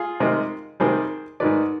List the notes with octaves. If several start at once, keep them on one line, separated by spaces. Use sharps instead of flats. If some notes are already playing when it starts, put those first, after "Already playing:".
Already playing: F4 G#4
C3 D#3 G#3
C3 D#3 G3 G#4 C5
G#2 D#3 G#3 B4 D5